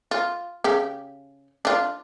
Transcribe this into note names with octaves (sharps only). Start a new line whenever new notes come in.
F4
C#3 G4
D4 F4